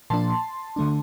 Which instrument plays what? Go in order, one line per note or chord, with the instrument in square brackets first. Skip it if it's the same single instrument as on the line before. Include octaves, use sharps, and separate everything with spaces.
[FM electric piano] A#2 F3 A#3 D4 A5 C6
D3 A3 D4